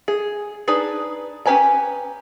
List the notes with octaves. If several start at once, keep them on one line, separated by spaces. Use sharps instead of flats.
G#4
D4 D#4 G#4 B4
C#4 G4 B4 G#5 A#5